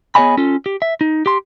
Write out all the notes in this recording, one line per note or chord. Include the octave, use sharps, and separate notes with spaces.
B3 G#4 C#5 D#5 G#5 B5
C#4 F4 A4
G4
E5
D#4
G4 C6